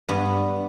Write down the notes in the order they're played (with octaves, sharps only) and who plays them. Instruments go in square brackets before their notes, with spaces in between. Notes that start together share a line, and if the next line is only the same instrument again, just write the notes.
[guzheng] G2 B3